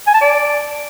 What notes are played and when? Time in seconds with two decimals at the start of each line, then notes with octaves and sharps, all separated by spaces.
0.07 G#5
0.14 A5
0.21 D5